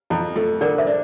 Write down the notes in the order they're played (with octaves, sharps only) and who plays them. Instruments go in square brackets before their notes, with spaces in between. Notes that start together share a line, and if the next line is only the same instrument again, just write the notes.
[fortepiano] F2 [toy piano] E4
[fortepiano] A3 [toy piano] F4
[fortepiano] D3 [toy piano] A#4 D5
[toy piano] C5 E5
[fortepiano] D4